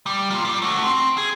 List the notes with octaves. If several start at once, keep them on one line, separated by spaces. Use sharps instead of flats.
G3
A#3 F4
G3
A3 F#4
C4
G#4